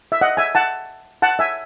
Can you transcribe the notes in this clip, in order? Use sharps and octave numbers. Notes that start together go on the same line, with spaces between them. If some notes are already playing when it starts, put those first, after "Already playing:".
E5
D#5 F#5
E5 G#5
F#5 A5
F#5 A5
E5 G#5